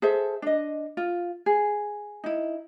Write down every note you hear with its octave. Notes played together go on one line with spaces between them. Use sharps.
G#4 A4 C5 E5
D4 D#5
F4
G#4
D#4 E4